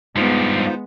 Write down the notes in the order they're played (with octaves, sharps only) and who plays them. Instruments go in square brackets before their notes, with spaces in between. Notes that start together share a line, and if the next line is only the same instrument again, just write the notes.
[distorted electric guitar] G2 F3 [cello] G#3 B3 [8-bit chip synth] D#4 F4 C5